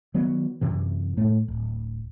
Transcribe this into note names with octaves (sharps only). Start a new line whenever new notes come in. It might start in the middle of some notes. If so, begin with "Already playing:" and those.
D#3 F#3 B3
F#2 C3 E3
A2 A3
D1